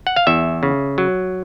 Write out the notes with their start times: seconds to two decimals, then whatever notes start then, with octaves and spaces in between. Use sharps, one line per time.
0.07 F#5
0.16 F5
0.27 E2 E5
0.63 C#3
0.98 F#3